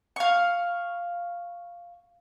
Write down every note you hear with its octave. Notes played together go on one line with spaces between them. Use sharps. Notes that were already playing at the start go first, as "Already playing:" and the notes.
F5 C#6